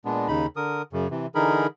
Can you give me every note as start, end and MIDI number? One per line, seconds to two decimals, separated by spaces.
0.05 0.28 46
0.05 0.28 56
0.05 0.28 59
0.05 0.28 62
0.28 0.46 39
0.28 0.46 49
0.28 0.46 63
0.28 0.46 83
0.56 0.82 50
0.56 0.82 70
0.56 0.82 87
0.93 1.07 42
0.93 1.07 49
1.11 1.27 48
1.11 1.27 52
1.35 1.67 50
1.35 1.67 52
1.35 1.67 63
1.35 1.67 68
1.35 1.67 70
1.35 1.67 83